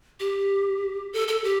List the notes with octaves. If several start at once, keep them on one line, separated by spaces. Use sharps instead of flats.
G4
A4
A4
G4